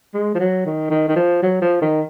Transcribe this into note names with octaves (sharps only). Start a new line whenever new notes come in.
G#3
F3
F#3
D#3
D#3
D#3
F3
F#3
F3
D#3